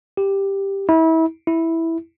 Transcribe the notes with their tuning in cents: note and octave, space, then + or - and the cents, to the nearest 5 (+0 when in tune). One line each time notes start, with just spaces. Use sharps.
G4 +5
E4 -30
E4 -5